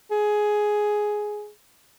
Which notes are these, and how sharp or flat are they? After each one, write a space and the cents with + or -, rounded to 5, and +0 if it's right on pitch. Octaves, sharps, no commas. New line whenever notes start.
G#4 +10